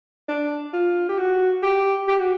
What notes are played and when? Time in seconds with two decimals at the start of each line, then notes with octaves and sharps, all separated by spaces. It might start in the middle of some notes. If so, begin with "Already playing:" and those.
0.28 D4
0.73 F4
1.09 G4
1.18 F#4
1.63 G4
2.08 G4
2.19 F#4